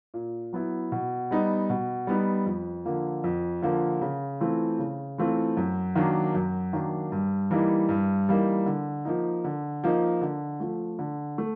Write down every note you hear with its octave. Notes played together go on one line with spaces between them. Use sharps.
A#2
F#3 B3 E4
B2
G3 B3 D#4
B2
G3 B3 D#4
F2
D3 F3 A#3
F2
D3 F3 A#3
C#3
E3 A3 C4 F4
C#3
E3 A3 C4 F4
F#2
D#3 F#3 A#3 D4
F#2
D#3 F#3 A#3 D4
G2
E3 G3 A#3 D#4
G2
E3 G3 A#3 D#4
D3
F3 A#3 D#4
D3
F3 A#3 D#4
D3
F3 A3
D3
A3